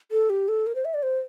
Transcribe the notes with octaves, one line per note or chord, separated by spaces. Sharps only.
A4
G4
A4
A#4
C5
E5
D5
C5